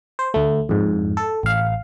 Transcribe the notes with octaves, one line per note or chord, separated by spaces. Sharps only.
C5
D2 A3
F2 G#2
A4
A1 F5